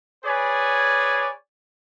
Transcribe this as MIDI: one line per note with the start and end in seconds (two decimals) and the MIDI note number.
0.24 1.30 68
0.24 1.30 71
0.24 1.30 73
0.24 1.30 74
0.24 1.30 80